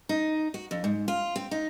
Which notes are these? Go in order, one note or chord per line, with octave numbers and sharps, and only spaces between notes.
D#4
F#4
F2
G#2
F4
C4
D#4